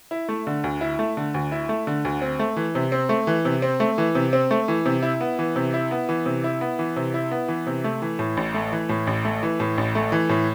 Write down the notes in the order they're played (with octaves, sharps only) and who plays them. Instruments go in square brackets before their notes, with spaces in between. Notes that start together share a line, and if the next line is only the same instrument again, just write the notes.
[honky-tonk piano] E4
A3
D3
D2
E4
A3
D3
D2
E4
A3
D3
D2
C4
A3
E3
C3
C4
A3
E3
C3
C4
A3
E3
C3
C4
A3
E3
C3
E4
B3
E3
C3
E4
B3
E3
C3
E4
B3
E3
C3
E4
B3
E3
C3
A3
E3
A2
A1
A3
E3
A2
A1
A3
E3
A2
A1
A3
E3
A2